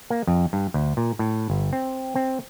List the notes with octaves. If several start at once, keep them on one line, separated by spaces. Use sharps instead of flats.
A#3
F2
G2
D2
A#2
A2
G1
C4
C4